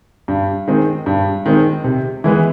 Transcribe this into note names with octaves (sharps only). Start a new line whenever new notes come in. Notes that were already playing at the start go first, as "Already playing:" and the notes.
G2
D#3 G#3 C4
G2
D#3 G#3 C4
C3
E3 G#3 B3